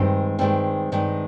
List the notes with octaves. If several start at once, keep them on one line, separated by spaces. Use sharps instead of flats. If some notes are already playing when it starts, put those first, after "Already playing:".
Already playing: G2 D#3 G#3 C4
G2 D#3 G#3 C4
G2 D#3 G#3